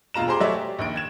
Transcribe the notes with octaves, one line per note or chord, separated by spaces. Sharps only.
E1 B2 F4 A#5 E7
G4 G#4 C5 A#5 C6 D6
F#3 A3 C#5 D5 E5
G4
A#1 D#2 D7
G#6 E7